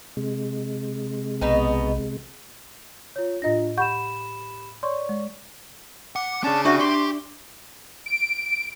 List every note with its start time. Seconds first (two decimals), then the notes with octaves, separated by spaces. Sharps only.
0.17 C3 G#3
1.41 B1 B2 B3 D#4
3.16 F4 C#5
3.42 A2 D4 F4 D#5 A#6
3.77 G4 F#5 B5 C#6 G6 E7
4.83 C#5 D5 C6 C#6
5.09 G#3
6.16 F#5 D6
6.44 C#4 D4 G#4 A5
6.65 D4 F#4 D5 E5
6.80 D4 G4 C6 C#6
8.06 D7